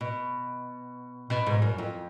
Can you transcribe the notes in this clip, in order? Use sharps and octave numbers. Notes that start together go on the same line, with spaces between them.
B2
B2
G#2
F#2
F2